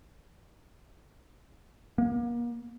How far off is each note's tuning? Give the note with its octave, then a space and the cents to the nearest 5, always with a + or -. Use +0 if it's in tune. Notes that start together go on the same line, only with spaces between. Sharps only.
A#3 +35